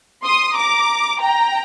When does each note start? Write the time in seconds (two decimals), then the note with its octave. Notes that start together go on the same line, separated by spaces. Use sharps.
0.24 C6 D#6
0.56 A#5 D6
1.20 G5 A#5